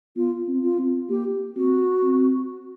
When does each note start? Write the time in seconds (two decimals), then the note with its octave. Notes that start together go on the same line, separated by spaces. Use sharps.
0.16 B3 F4
0.48 C4
0.63 F4
0.78 C4
1.09 A#3 G4
1.56 C4 F#4
2.03 C4